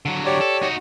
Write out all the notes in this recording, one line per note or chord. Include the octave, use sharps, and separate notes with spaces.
D3 F#3
G4 C#5 D5
A4
D#4 F#4